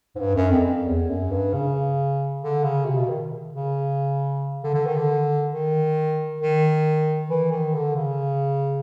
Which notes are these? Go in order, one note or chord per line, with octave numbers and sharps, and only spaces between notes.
G#2
G2
F#2
F2
F2
E2
F#2
G2
C#3
D3
C#3
C3
B2
D#3
C#3
D3
D3
D#3
D3
D#3
D#3
E3
D#3
D3
C#3